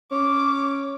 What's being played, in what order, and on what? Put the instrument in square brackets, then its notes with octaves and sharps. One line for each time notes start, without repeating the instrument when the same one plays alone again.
[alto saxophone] C#4 [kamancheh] D6